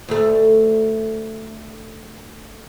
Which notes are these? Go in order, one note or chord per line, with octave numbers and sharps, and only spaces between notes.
D2 A3